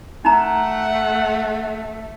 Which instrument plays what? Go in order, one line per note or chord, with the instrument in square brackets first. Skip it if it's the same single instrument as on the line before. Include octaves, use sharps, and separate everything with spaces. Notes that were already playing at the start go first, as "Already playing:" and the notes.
[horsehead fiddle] A3 [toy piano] D#4 A#5 [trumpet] F#5